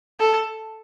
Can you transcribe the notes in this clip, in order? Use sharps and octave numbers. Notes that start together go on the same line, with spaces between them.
A4